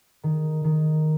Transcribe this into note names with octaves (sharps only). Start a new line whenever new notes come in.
D#3
D#3